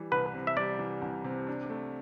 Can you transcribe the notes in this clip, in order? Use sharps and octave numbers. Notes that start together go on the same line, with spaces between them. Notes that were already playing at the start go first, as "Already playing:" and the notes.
Already playing: E3 G3
C2 B4
C3
E5
G3 D5
E3
C2
C3
D4
A3